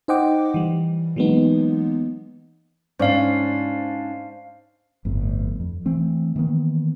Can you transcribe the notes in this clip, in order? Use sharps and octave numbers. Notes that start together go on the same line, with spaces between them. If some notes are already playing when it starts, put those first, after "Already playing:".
D#4 C5 D#5 F#5 G5 D6
E3 G3
E3 F#3 G#3 A#3 B3 D#4
G#2 C#4 D4 C5 D5 F5
G1 F2 A2
F2
E3 A3 C4
D#3 E3 A#3 B3